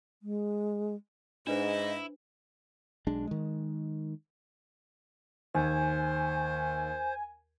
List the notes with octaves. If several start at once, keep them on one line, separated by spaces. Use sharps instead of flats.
G#3
G#2 D4 E4 B4 C5 D#5
B1 G#3 D4
D#3 G#3
D#2 C5 G#5